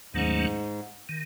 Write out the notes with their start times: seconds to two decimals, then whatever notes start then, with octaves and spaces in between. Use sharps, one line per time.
0.14 D#2 G#2 D#3 F#3 A3 C#4
1.09 D#3